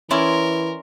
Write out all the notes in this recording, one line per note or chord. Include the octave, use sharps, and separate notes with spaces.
E3 C#4 E4 A#4 D5 C6